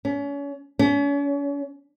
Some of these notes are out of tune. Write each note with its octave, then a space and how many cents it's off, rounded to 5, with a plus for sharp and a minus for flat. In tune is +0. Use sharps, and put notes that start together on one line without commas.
C#4 +35
C#4 +40